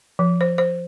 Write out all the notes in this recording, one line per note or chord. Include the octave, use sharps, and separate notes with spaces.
F3
C5
C5